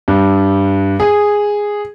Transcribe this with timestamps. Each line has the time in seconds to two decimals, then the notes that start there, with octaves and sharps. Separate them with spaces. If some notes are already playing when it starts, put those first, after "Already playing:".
0.08 G2
1.00 G#4